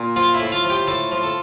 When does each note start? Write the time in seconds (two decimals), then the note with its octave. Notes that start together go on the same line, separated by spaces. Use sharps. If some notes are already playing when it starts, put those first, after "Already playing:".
Already playing: A#2
0.16 F3 F4 F5
0.34 E4 E5
0.40 A2
0.52 F4 F5
0.64 F3
0.70 G4 G5
0.87 A2 A4 A5
1.12 F3
1.23 A4 A5